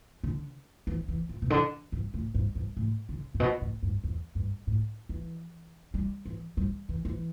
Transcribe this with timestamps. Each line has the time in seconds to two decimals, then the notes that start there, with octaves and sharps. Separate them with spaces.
0.23 D3
0.87 E3
1.08 E3
1.29 E3
1.42 B2
1.50 D3
1.92 G2
2.14 A2
2.35 G2
2.55 G2
2.77 A2
3.09 D3
3.34 A2
3.40 B2
3.61 A2
3.83 G2
4.04 E2
4.35 G2
4.67 A2
5.09 E3
5.94 G3
6.26 E3
6.57 G3
6.89 E3
7.05 E3